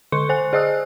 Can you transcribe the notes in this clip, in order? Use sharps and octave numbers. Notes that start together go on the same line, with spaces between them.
D3 A4 C6 C#6 C#7
C5 G#5 F#6
G#4 C5 D#5 D#6 E6 F#6